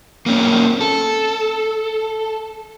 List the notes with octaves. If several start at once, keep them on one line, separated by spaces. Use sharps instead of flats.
A#3 C4 C#4
A4